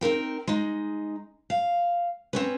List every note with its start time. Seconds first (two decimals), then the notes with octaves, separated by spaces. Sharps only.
0.01 C4 D#4 A#4 G5
0.48 G#3 D#4
1.50 F5
2.33 C4 C#4 B4